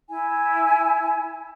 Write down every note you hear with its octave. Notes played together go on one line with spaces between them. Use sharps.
E4 G#5